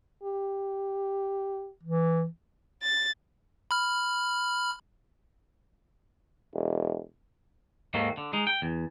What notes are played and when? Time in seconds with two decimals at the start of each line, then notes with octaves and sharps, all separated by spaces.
0.23 G4
1.83 E3
2.83 A6
3.71 B5 F6
6.54 E1
7.94 D#2 G#2 D#3 A3 A#3
8.18 D3
8.33 G#3 D#4
8.47 G5
8.62 E2